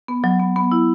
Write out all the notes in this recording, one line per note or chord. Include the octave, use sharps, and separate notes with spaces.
B3
F#3
B3
B3
E4